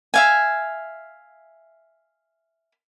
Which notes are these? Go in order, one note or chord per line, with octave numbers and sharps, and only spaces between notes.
E5 F5 G#5